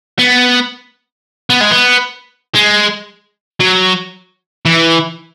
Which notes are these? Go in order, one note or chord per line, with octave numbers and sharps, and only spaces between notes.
B3
B3
G#3
B3
G#3
F#3
E3